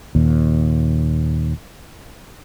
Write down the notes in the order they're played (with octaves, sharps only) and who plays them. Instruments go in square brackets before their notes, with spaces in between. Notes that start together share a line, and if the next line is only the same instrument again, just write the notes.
[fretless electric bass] D#2 A#2